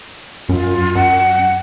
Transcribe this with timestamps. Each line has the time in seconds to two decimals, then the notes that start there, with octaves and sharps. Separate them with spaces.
0.49 F#2 F4
0.95 F#2 F#5